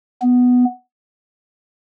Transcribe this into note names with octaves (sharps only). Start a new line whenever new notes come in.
B3